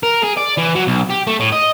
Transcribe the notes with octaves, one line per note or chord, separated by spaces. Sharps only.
A#4
G#4
D5
E3
F#3
B1
G4
A3
A2
D#5